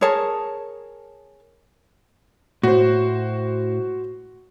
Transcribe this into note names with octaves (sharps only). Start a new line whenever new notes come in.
G#4 A#4 C#5 A5
A2 F#4 C5